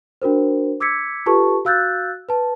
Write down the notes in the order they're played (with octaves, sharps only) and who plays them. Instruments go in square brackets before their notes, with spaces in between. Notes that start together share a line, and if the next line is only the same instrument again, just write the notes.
[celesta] D4 F#4 A#4 C5
D6 E6 G#6 B6 C#7
F4 G4 A4 B4 A5 C#6
F#4 F5 E6 F#6 G6 A6
B4 A5